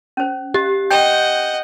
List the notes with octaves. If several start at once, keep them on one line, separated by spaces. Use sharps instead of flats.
C#4 C5
G4 D#5
D#5 F#5 G5 G6